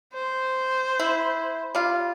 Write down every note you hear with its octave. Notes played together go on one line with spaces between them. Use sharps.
C5
E4
G3 F4